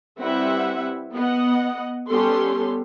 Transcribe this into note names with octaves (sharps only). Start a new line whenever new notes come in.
G3 C4 E4 B4 E5 F#5
B3 D#5 F#5
G3 B3 C#4 G4 A4 C6